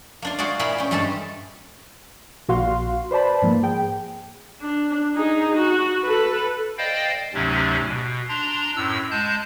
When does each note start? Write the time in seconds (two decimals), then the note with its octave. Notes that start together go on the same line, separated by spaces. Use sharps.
0.22 A#3 D4 F4
0.39 F4 F#4 G#4 C5 D5
0.59 A#2 E4 G#4 A#4 A#5 B5
0.78 C#4 G5
0.91 G2 G#3 C#4 G4 A4 A5
2.48 A#1 A#2 F#4 F5 C6
3.11 B4 C5 D5 A5 B5
3.42 G#2 F3 A#3
3.63 G#4 G5
4.61 D4
5.16 D#4 G#4
5.56 F#4
6.03 A4 B4
6.78 C5 D5 D#5 F5 G5
7.34 D2 G#2 C3 F#3 C#4
7.87 B2
8.29 D4 A#5 C6
8.76 F#2 A2 E6
9.11 G#3 A5 G6